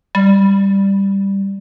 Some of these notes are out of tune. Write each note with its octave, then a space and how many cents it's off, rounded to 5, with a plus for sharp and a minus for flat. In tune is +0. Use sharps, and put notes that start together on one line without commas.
G3 +5